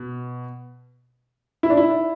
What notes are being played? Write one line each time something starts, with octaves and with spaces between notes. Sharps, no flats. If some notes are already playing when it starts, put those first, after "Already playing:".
Already playing: B2
E4
D4
E4